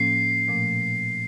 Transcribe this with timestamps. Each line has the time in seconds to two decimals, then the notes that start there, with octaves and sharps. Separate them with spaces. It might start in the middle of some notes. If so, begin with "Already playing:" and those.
Already playing: A2 F3 A#3 C#4 C7
0.48 A#2 F3 A3